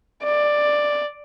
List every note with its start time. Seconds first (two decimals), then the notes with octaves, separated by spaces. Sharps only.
0.24 D5